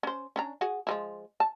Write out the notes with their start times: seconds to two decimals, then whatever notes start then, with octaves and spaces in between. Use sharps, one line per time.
0.03 C#4 C5
0.36 C#4 D4 A#5
0.61 F#4 G#4 F#5
0.87 F3 G#3 E4
1.40 A5